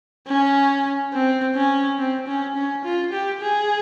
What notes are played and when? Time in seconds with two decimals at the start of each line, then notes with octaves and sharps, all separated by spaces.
0.28 C#4
1.14 C4
1.56 C#4
1.99 C4
2.27 C#4
2.56 C#4
2.84 F4
3.12 G4
3.41 G#4